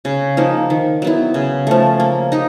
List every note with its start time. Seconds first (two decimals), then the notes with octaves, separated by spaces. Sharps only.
0.05 C#3
0.37 F3 A#3 D#4
0.70 D#3
1.02 F#3 B3 E4
1.34 C#3
1.67 F3 A3
2.00 A#3
2.32 D#4 G4